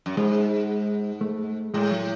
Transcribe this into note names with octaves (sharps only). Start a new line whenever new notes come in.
F#2
G#2 G#3
A3
A2 G#3
F#3